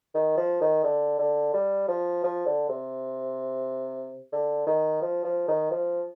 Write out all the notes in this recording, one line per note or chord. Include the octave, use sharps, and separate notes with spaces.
D#3
F3
D#3
D3
D3
G3
F3
F3
D3
C3
D3
D#3
F3
F3
D#3
F3